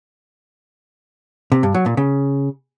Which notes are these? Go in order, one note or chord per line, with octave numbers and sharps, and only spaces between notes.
C3
G2
F#3
A#2
C#3